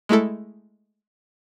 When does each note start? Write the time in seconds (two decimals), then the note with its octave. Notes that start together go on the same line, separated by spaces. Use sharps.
0.09 G#3 A3 E4 A4